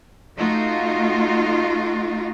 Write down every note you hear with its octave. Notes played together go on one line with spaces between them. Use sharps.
A3 D#4 F4 F#4